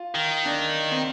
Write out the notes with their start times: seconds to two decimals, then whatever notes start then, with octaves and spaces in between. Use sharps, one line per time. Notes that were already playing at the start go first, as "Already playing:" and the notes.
Already playing: F4
0.15 D#3
0.45 D4
0.91 C4